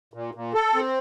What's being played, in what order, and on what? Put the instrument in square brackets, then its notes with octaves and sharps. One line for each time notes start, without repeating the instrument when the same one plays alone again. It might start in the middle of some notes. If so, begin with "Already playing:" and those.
[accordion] A#2
A#2
A4
C4